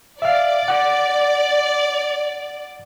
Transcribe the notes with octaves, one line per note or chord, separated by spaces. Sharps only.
D5 E5 F5
F#5 D6